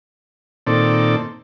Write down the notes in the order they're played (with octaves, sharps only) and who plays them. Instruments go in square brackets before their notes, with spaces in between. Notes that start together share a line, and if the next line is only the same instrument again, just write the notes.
[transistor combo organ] A#2 D#3 C4 A4 D5